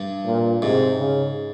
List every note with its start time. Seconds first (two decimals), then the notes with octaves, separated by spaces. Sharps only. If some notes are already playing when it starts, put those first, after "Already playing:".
Already playing: G2
0.26 A#2
0.62 G#2 C3
0.98 C#3